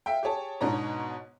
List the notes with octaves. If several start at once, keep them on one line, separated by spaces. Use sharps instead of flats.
E5 F5 G5
G4 G#4 C#5 A5
G#2 B2 D4 C#5 A#5